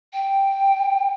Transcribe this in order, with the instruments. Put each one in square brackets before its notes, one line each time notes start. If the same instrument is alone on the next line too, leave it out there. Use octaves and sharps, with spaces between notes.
[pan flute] G5